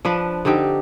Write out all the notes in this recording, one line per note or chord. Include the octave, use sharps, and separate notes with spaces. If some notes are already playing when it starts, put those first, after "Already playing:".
F3 D4 B4
D3 C4 D#4 G4